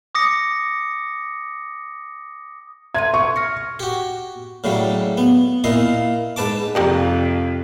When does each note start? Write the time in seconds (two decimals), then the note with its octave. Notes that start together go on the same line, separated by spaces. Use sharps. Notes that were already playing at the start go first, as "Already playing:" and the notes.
0.15 D6 D#6 A#6 C#7
2.95 E5 C6 G#6 D#7
3.14 C#6
3.36 F6 A#6 C#7
3.79 F#4 G4
4.64 A2 C#3 F#3 G3
5.18 B3
5.64 A#2 E4 D#5 F5
6.36 G#2 B4 A5 D6
6.75 F2 C3 G3 A#3 D#4